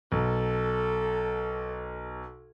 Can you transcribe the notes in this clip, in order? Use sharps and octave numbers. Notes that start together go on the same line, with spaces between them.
B1 A4